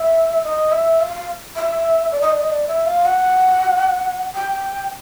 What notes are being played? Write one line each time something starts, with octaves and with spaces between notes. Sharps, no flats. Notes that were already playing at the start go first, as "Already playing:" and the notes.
Already playing: E5
D#5
E5
F5
E5
D5
D#5
D5
D#5
D5
E5
F5
F#5
G5